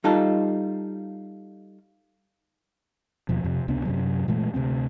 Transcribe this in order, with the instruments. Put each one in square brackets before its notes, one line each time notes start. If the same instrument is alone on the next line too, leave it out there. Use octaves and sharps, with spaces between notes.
[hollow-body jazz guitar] G3 D#4 F4 A4
[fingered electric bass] D#2 B2 F3
F2 C3
C#2 C3 B3 D4
F#2 C3 F#3
A#2 E3 G#3 A3
D2 C3 A3 C4